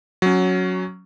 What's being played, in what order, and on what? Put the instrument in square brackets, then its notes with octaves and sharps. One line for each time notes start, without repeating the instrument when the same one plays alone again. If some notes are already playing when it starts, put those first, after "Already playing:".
[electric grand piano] F#3 C#4